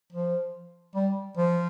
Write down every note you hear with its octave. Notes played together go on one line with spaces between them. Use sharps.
F3
G3
F3